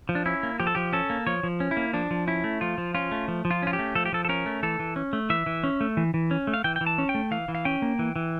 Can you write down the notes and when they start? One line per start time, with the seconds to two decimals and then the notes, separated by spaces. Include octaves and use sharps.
0.09 F3
0.15 D4
0.25 C#4 E4
0.43 A#3
0.60 F3 G4
0.67 A4
0.75 F3 G4
0.93 C#4 A4
1.10 A#3
1.27 F3 C#5
1.43 F3
1.60 C#4
1.71 E4
1.77 A#3
1.93 F3 D4
2.11 F3
2.27 C#4 E4
2.44 A3
2.61 F3 F4
2.78 F3
2.95 C#4 F4
3.11 A3
3.28 F3
3.45 F3
3.51 F4
3.62 C#4 F4
3.73 G4
3.79 A3
3.95 F3 A4
4.05 G4
4.13 F3 A4
4.25 A4
4.29 C#4 A#4
4.46 A3
4.63 E3 A4
4.79 E3
4.96 C#4
5.13 A3
5.30 E3 E5
5.46 E3
5.64 C#4
5.81 A3
5.97 E3
6.14 E3
6.31 C#4
6.47 A3
6.54 F5
6.64 E3 G5
6.76 G5
6.81 E3
6.86 A5
6.98 C#4
7.09 G5
7.15 A3
7.31 E3 F5
7.48 E3
7.55 F5
7.65 C#4 G5
7.82 A#3
7.99 E3
8.16 E3